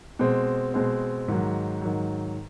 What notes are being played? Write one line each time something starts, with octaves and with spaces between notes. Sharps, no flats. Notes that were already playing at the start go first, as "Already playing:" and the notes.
B2 G#3 C4
B2 G#3 C4
G#2 D#3 F#3
G#2 D#3 F#3